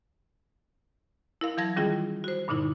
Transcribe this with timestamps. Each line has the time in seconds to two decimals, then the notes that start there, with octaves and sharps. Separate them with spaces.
1.41 E4 A#4 F5
1.57 E3 F#3 F5 A5 G#6 A#6
1.76 D#3 G3 C#4 E4 F4 G#4
2.24 F#4 C5
2.48 G2 A#2 D3 D#4 E4